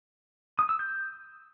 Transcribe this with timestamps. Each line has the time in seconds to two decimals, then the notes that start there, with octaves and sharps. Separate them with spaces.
0.59 D#6
0.69 E6
0.79 G6